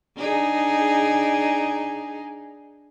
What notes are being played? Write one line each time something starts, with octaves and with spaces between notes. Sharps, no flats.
D4 D#4 G#4